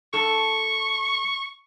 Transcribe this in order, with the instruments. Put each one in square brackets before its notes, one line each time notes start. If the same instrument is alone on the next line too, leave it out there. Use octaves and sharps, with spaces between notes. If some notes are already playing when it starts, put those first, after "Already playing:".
[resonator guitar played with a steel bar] G2 A4 [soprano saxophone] C#6